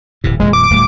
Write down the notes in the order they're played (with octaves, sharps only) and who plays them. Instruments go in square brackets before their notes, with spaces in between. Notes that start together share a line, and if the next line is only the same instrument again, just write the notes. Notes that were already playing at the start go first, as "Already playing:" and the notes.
[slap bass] D1 A2 C3
[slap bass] D#1 F2 A#2 [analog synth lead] G#3
[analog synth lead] D6
[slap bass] D1 A2 G3